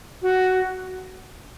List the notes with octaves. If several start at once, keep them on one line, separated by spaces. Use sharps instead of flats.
F#4